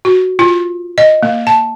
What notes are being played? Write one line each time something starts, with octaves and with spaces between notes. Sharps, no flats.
F#4
F4
D#5
A#3
A5